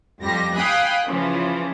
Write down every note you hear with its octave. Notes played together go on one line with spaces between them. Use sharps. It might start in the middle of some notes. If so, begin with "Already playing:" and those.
F2 G3 G4 A#6
F5 G5 G#5 B5 D#6 F#6
C#3 E3 F3 C#4